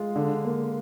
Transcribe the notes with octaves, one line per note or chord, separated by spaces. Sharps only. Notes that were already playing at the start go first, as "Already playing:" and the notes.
Already playing: G#3 F4
D3
A#3